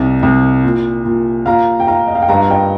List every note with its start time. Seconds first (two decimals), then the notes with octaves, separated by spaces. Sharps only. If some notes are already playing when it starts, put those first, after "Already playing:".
Already playing: C2 D#4
0.23 C2
0.64 A#2
1.05 A#2
1.46 A#2 F5 A#5
1.80 G5
1.87 D#4 F5 A#5
2.08 D#5
2.15 F5
2.22 G5
2.29 G2 F5 A#5
2.41 F5
2.50 D#5 G5